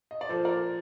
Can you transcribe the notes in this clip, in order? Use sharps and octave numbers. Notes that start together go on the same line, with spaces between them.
D#5
D5
A#2 F3 A4 C5
A#4 D5